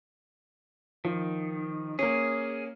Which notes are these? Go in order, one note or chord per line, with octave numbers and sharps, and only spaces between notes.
D#3 F3
A#3 C#4 G#4